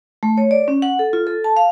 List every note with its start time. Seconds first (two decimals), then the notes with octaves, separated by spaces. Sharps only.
0.23 A3
0.38 C#5
0.51 D5
0.68 C#4
0.82 F#5
0.99 A4
1.13 F4
1.27 A4
1.44 A5
1.57 F5